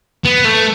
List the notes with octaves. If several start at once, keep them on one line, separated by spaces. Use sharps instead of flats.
B3
A3